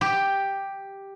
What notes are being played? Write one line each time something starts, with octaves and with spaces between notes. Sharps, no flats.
G4